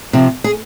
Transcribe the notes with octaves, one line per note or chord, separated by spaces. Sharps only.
C3 F3
G#4